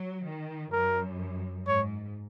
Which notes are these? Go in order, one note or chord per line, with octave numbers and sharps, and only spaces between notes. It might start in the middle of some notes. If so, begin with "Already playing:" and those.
Already playing: F#3
D#3
F#2 A#4
G#2 C#5